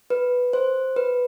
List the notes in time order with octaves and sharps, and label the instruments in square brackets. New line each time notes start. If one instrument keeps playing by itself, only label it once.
[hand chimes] B4
C5
B4